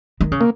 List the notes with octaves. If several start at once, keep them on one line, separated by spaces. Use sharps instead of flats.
D#3
C#3
A#3